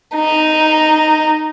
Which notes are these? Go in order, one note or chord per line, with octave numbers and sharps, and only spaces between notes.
D#4